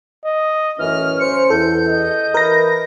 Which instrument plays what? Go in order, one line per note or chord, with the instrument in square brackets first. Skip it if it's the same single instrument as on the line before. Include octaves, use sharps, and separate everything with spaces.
[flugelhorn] D#5
[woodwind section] F#2 A2 E3 [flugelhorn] C#4 [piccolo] F6
[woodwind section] C5 [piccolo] C#7
[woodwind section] E2 [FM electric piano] A4 [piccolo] G6
[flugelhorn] D#5
[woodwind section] E3 B4 [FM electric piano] A#4 A#6